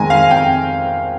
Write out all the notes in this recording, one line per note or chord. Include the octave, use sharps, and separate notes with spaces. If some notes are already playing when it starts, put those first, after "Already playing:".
Already playing: F2 D#3 G#3 G#5 A#5
F5
F2 G5